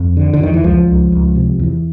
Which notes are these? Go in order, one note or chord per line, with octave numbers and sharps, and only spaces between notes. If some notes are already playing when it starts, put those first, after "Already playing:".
Already playing: F2
D3
D3
F2 D#3
E3
C#2 F3
C#2
C#2
C3
E2